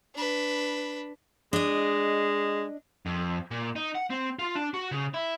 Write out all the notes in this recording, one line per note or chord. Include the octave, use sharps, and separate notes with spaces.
D4 B4
G#3 D4 D#5
F2
A#2
D#4
F#5
C4
F4
D4
F#4
C#3
E4